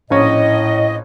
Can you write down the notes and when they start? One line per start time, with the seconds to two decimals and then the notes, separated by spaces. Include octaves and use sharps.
0.10 A#1 A2 C#4 D#5